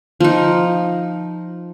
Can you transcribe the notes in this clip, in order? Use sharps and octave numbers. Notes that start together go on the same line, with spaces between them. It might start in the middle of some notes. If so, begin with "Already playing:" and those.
F3 D#4